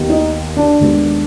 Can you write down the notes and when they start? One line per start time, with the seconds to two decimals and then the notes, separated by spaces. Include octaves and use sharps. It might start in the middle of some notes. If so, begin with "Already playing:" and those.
Already playing: D#2 D#3 B3
0.10 D#4
0.57 D4
0.79 D#2 D#3 G#3 B3